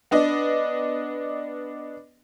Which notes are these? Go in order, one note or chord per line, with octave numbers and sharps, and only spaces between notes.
B3 D4 D#5